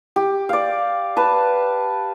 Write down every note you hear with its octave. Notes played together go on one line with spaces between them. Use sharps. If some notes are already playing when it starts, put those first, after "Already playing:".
G4
D5 F5
B4 A5